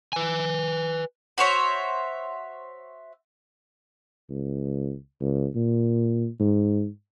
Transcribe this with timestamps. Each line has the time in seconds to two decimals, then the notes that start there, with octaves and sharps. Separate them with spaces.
0.13 B4 G#5
1.38 F#4 C5 C#5 E5
4.30 C#2
5.21 C#2
5.55 A#2
6.40 G#2